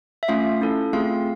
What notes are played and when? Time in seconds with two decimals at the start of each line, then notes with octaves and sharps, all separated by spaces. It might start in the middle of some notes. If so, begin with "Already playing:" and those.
0.23 E5
0.28 A3 C#4 F4 F5
0.61 C#4 E4 A4
0.93 A3 C4 F4 G#4 F5